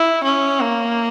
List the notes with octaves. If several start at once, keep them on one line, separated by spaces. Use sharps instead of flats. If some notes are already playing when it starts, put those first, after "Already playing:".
Already playing: E4
C#4
A#3